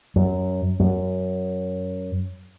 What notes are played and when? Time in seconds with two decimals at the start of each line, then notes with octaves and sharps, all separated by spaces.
0.16 F#2
0.80 F#2